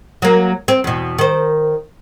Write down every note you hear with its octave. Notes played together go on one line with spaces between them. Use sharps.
F#3 A#3
C4
E2 B2
D#3 C5